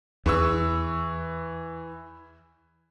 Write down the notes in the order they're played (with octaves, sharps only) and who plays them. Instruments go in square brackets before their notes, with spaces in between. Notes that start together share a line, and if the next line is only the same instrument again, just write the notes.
[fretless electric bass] E2 [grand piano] E3 C#6 E6